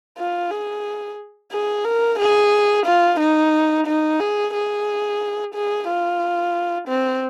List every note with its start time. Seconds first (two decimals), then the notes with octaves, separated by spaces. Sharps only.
0.18 F4
0.51 G#4
1.52 G#4
1.85 A#4
2.19 G#4
2.86 F4
3.20 D#4
3.87 D#4
4.20 G#4
4.54 G#4
5.54 G#4
5.88 F4
6.88 C4